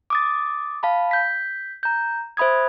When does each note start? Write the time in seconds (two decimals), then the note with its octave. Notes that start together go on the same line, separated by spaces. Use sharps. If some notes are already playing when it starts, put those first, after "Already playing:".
0.10 D6 D#6 A6
0.83 F5 A5 B5
1.11 G6 B6
1.83 A#5 G6
2.37 C5 E5 B5 D#6 G#6